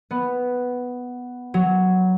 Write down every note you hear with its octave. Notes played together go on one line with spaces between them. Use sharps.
B3
F#3